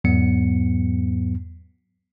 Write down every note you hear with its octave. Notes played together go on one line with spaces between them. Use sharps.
E2 G#2 F#3 B3 C#7